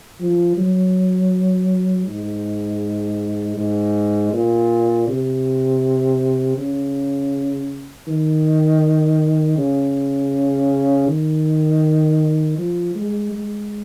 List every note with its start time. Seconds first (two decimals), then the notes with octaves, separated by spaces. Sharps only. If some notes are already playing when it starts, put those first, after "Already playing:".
0.20 F3
0.58 F#3
2.07 G#2
3.57 G#2
4.33 A#2
5.08 C3
6.58 C#3
8.08 D#3
9.58 C#3
11.08 D#3
12.58 F3
12.95 G#3
13.33 G#3